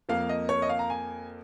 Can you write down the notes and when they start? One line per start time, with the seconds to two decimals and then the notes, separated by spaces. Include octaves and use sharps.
0.09 F2 F3 A#3 F5
0.29 D#5
0.49 C#5
0.62 D#5
0.69 F5
0.79 A#5
0.90 G#5